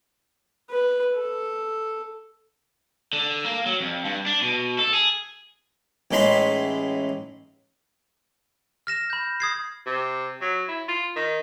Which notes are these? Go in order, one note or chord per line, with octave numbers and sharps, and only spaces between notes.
B4
A4
D3
A#3
F#3
F2
G2
D4
B2
A4
G#4
A1 A2 G#3 D#4 B5 C6
F6 A#6 E7
B5 G6
D#6 G#6 C7
C3
F#3
E4
F4
D#3